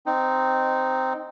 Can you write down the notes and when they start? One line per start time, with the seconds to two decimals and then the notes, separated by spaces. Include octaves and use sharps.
0.06 C4 D#4